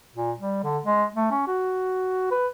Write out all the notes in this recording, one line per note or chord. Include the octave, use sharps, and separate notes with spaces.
A#2
G3
D3
G#3
A3
C#4
F#4
B4